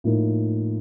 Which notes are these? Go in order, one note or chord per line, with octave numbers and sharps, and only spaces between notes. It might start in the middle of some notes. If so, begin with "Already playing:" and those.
A2 F3 A#3 D#4